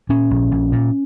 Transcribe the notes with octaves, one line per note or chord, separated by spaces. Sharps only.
A#2 C#4
A#1
A#1
A#2